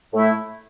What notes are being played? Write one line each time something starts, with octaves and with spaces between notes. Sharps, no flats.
A2 A3 E4